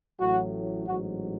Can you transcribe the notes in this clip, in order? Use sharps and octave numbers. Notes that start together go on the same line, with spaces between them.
A1 A2 F#3 F#4
A1 G#2 F#3 F#4